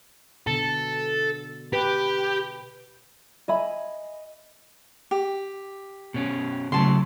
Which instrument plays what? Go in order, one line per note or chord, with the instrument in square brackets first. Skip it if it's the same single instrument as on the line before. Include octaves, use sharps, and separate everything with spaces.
[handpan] B2 D3 [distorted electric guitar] A4
[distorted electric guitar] G4 [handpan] B4
[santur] D#5 [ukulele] E5 G#5 B5
[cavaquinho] G4
[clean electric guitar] B2 C#4
[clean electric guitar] C#3 F#3 A3 [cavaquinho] A5 C6